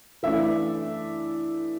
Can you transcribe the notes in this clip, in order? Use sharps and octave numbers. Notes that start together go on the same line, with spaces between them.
E3 A3 D4 E5